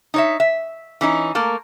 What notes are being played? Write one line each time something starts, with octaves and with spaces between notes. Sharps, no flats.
D#4 C#5 E5
E5
E3 C#4 D#4
A3 A#3 A#4